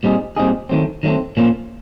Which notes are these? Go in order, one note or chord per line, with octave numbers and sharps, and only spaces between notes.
A#2 G3 C4 D#4 G#4
A#2 G3 C4 D#4 G#4
D#3 F#3 A3 C4
D#3 F#3 A3 C4
A#2 F3 A#3 C#4